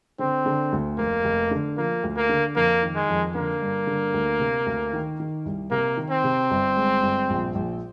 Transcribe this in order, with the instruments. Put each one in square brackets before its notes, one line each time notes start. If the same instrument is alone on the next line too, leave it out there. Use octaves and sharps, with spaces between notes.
[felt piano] D3 [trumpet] C4
[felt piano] D3
D2
[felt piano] F1 [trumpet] A#3
[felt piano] F1
D3
[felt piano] F3 [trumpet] A#3
[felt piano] D2
[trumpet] A#3
[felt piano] D3
[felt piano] F2 [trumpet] A#3
[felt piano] D#3
[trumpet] G#3
[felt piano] F2
[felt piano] D3 [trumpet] A#3
[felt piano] G2
D3
D2
C3
D2
D#3
D#3
C2
[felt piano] C3 [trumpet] A#3
[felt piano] D#3
[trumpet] C4
[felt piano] C3
G1
G#3
G1
A#1
A#1